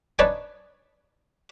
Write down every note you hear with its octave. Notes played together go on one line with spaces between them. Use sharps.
D4 D#4 B4 C#5 D5 G#5